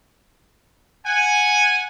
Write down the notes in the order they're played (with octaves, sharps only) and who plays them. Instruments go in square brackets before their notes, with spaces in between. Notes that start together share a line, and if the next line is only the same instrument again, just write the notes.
[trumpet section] F#5 G#5